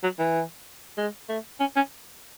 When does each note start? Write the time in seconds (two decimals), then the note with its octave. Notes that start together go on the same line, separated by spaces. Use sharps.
0.03 F#3
0.18 E3
0.97 G#3
1.29 A3
1.60 C#4
1.76 C#4